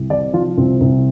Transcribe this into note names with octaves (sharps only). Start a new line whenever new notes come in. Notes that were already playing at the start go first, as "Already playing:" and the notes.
Already playing: C2
C3 D5
F3 F4
C2 C4
C2